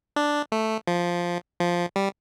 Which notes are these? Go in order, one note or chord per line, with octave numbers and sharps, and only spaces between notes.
D4
A3
F3
F3
G3